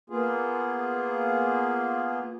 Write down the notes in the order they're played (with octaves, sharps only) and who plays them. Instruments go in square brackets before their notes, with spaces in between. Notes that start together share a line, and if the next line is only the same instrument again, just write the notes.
[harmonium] A#3 B3 F4 G#4